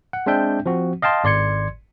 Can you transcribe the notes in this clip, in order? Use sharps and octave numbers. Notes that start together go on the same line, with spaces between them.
F#5
G#3 C4 D4 E5 G5 G6
F3 C4 F#4
D#5 F5 G5 A5 C6
G#1 D5 C6 G#6 C#7